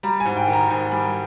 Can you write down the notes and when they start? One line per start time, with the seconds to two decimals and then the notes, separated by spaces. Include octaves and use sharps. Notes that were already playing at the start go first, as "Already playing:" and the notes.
0.03 G3 A#5
0.20 G#5
0.25 G#2
0.37 G5
0.47 D#3
0.53 A#5
0.70 G#2 G#5
0.92 G3